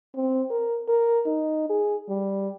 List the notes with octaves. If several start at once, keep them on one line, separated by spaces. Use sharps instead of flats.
C4
A#4
A#4
D#4
G#4
G3